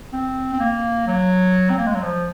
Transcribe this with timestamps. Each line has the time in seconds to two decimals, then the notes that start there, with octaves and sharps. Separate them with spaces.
0.13 C4
0.53 C4
0.60 A#3
1.07 F#3
1.70 C4
1.78 A#3
1.86 G#3
1.95 F#3
2.02 F3